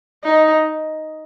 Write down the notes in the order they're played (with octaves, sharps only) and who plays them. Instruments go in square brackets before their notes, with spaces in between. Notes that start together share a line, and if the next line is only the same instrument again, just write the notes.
[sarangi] D#4